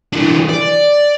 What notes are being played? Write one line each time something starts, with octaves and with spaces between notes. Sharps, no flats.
E3 D4
D5